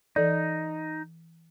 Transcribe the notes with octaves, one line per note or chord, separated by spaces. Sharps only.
E3 D#4 A4 D5